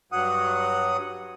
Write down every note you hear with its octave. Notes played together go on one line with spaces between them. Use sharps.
G2 F#3 F#5 D#6